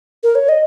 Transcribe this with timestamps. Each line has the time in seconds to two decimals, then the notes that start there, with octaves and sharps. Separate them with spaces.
0.23 A#4
0.35 C#5
0.49 D#5